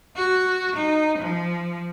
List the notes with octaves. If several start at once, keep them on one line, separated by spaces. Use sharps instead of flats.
F#4
D#4
F3